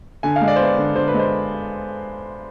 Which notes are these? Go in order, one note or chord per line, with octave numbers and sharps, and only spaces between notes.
D3 G#5
F5
G#3
D5
B3 C5
D5
D3
D3 C5
B4
G#3
C5